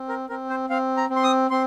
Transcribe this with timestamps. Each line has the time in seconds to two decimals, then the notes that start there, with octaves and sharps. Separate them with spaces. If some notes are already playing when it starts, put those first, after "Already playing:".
Already playing: C4
0.09 A#4
0.29 C4 A#4
0.50 C5
0.70 C4 F5
0.97 A#5
1.10 C4
1.16 C6
1.24 D#6
1.50 C4 C6